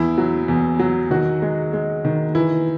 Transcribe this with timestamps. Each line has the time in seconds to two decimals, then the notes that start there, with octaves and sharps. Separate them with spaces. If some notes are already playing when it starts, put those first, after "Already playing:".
Already playing: E2 E4
0.18 F#3
0.48 E2
0.79 F#3
1.11 D#3 F#4
1.42 G#3
1.73 G#3
2.05 D#3
2.35 E3 E4